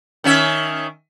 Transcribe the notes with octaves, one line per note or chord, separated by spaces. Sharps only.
D#3 C#4 E5